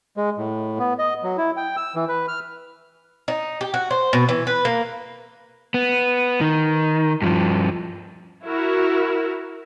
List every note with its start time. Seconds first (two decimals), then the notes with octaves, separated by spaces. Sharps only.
0.17 G#3
0.38 A2
0.79 B3
0.99 D#5
1.23 F#3
1.38 E4
1.57 G5
1.77 E6
1.96 E3
2.08 B4
2.28 F6
3.28 D#4
3.61 G4
3.74 F#4
3.91 C5
4.13 B2
4.29 E3
4.47 B4
4.65 A#3
5.74 B3
6.41 D#3
7.22 G2 F3
8.45 E4 F#4 A#4